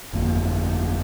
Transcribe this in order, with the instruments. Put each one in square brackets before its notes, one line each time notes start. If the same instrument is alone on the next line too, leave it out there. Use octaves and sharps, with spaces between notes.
[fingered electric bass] G1 F2 A#3